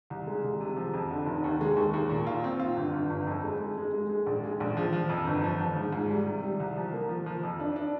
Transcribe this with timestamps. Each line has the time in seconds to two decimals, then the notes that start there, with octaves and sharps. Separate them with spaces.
0.10 C2
0.27 G#3
0.44 C2
0.61 C3
0.76 F3
0.94 F2
1.11 D3
1.26 F1
1.44 D#2
1.61 G#3
1.76 D#2
1.93 D#2
2.10 A#2
2.27 F4
2.44 C4
2.60 F4
2.77 G1
2.93 G1
3.10 G1
3.27 F2
3.44 G#3
3.60 G#3
3.77 G#3
3.94 G#3
4.09 G#3
4.26 A#1
4.43 G#3
4.60 A#1
4.77 F3
4.93 F3
5.09 F2
5.27 G1
5.44 F3
5.60 F3
5.77 G#2
5.93 G#2
6.10 G3
6.26 C3
6.43 G3
6.60 C2
6.77 F3
6.93 A#3
7.09 F3
7.26 F3
7.43 F2
7.60 D4
7.76 D4